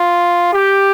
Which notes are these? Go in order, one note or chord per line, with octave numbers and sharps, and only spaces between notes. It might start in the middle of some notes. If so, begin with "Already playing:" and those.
Already playing: F4
G4